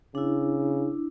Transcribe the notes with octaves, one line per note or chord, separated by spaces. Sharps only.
C#3 D4 E4